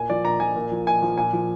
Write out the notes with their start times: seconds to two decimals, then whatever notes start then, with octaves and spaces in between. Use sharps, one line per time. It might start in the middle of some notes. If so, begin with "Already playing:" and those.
Already playing: A#2 G#5
0.10 F3 D5
0.24 A#2 A#5
0.40 F3 G#5
0.56 A#2
0.72 F3
0.86 A#2 G#5
1.02 F3
1.18 A#2 G#5
1.33 F3